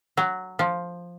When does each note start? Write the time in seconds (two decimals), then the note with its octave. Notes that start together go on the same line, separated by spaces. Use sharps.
0.17 F#3
0.59 F3